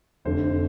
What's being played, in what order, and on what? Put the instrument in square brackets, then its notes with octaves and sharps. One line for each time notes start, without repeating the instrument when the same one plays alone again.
[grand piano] F1 F2 D3 C5